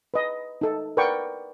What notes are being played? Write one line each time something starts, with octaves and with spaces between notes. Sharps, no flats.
B4 D#5
D#4 A4
A#4 B4 D5 F#5 G5 C#6